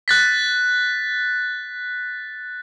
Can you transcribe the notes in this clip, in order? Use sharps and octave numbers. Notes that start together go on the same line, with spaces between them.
F#6 A6 B6